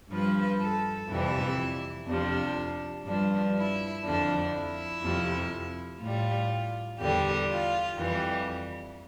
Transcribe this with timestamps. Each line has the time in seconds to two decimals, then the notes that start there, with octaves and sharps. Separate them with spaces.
0.11 G2 F3 B4
0.60 A4
1.09 F2 C3 E3 G3 E4
2.08 F2 C3 F3 D4
3.06 G2 F3 D4
3.56 E4
4.04 F2 D3 F3 D4
4.54 E4
5.03 F2 C3 F3
6.01 A2 G3 F4
7.00 E2 D3 G3 G4
7.50 F4
7.98 F2 E3 G3 G4